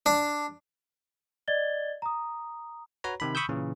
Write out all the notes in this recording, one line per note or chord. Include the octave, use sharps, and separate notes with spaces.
D4
D5 D#5 G#6 A6 G7
A#5 D#6
F#4 B4 C#5 A#5
C3 D#3 B5
B5 C#6 D#6 E6 G6
A#2 C#3 E3